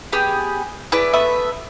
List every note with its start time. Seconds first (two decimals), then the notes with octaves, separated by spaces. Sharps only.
0.12 B3 G4 G#4
0.92 E4 G#4 B4 D5
1.13 A3 B3 B4 E5